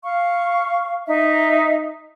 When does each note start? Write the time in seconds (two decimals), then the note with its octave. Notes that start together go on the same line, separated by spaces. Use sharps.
0.04 F5 C#6
1.08 D#4 D#5 E5